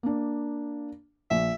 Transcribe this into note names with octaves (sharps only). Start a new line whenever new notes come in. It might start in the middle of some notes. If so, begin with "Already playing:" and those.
A#3 D4
A#1 E5